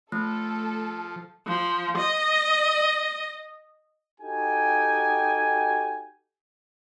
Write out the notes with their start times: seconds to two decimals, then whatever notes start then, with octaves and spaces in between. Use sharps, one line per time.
0.12 F3 A3 A4
1.47 F3
1.98 D#5
4.20 D#4 F#4 G4 A4 G5 G#5